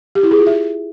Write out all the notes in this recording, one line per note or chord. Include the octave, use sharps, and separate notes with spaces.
G4
E4
G#4
F4
E5